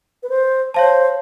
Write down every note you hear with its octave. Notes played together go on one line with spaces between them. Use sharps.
B4
C5
C5 C#5 F5 A5